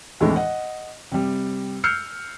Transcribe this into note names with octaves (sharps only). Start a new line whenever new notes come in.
D#2 A2 C3 E3 G#3 D4
D#5 F#5
C3 G3
E6 F6 G6 C7 C#7